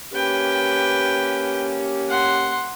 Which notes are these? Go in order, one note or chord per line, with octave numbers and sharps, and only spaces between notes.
A#3 C#4 G4 B4 G5
F#5 C6